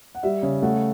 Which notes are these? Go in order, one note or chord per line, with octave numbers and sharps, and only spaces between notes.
F#5
G3 E5
C#3
A3 F#5